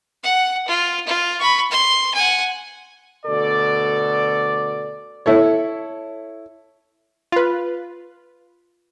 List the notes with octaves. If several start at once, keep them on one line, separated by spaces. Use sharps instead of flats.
F#5
F4
F4
B5 C#6
C6
F#5 G#5
D2 B2 A4 D5
E4 A4 C#5
F4 B4